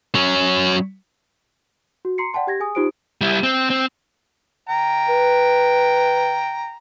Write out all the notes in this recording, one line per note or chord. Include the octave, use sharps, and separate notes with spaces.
F#3 C#4
F#4
A#5 C6 C7 C#7
D5 F#5 G5 A5 C6
G4 G#6 A#6
G#4 G#5 D#6
D#4 F4 G4 C5 D#6 D7
G3 E4
C4
C4
G5 A#5
B4